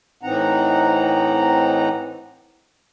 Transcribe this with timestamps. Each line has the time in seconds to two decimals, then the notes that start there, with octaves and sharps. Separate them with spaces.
0.23 A2 E3 C4 D#4 F#5 A#5